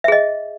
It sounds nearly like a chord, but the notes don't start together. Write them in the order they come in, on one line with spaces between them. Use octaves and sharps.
E5 G#4 D#5